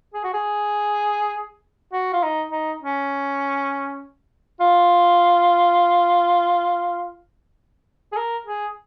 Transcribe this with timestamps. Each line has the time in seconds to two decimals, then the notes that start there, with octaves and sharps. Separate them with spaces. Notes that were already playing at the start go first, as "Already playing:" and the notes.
0.14 G#4
0.24 F#4
0.34 G#4
1.93 F#4
2.13 F4
2.23 D#4
2.51 D#4
2.82 C#4
4.60 F4
8.12 G#4
8.17 A#4
8.46 G#4